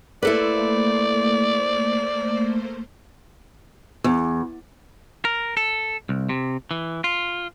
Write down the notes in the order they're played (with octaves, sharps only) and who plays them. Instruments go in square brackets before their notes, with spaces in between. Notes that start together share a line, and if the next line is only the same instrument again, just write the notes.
[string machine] A3 A#3 C5 [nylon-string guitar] E4 A4 B4 [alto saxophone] D5
[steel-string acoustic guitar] E2
[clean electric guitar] A#4
A4
C2
C3
E3
F4